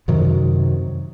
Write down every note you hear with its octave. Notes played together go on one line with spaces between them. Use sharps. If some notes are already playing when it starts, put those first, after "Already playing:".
F#2 C3 D#3 F#3